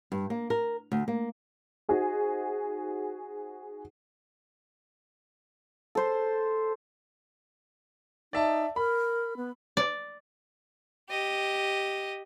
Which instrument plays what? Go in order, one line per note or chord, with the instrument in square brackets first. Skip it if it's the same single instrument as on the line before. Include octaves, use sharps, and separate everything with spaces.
[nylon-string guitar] G2
A#3
A#4
D2
A#3
[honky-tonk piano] D#4 F#4 G#4 C5
[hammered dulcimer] A4 C5
[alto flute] D#4 [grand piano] D5 E5 A5
[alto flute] A#4 [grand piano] B5
[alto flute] B3
[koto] D5
[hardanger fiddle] G4 D#5